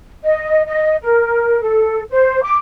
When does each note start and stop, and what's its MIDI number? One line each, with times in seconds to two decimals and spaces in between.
0.23 0.61 75
0.66 0.95 75
1.02 1.60 70
1.61 2.01 69
2.10 2.42 72
2.42 2.55 86